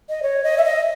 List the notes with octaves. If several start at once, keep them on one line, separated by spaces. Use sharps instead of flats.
D#5
C#5
D#5
E5
D#5